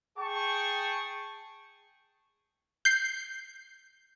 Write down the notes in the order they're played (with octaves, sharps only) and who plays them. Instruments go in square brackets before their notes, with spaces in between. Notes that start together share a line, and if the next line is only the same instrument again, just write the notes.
[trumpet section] G#4 G5 A5 C#6
[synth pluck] G6 C7